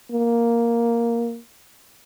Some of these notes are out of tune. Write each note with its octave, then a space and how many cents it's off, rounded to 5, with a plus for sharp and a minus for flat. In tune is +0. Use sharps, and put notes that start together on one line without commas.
A#3 +5